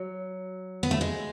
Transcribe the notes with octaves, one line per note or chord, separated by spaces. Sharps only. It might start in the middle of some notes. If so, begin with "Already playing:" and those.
Already playing: F#3
B3
A3
G#3